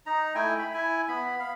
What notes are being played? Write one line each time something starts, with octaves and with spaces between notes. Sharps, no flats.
D#4 A#5
A3 E4 G5 G#5
B5
E4 G#5
B3 B5
F5 B5